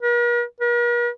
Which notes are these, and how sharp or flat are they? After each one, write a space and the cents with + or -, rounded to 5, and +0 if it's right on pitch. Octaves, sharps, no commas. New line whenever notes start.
A#4 +45
A#4 +45